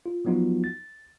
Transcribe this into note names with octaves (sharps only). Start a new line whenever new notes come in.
F4
F3 F#3 B3 D#4 F4 F#4
A6